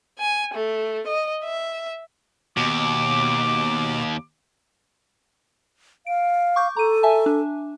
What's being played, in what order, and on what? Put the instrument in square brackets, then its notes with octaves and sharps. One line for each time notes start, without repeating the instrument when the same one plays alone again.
[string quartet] G#5
A3
D#5
E5
[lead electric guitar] D#2 [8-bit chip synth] B2 [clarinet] D6
[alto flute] F5 [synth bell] D7
[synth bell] C#6 D6 G6
[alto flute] A4 [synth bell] A#5 D#7
[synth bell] E5 G#5 A5
D4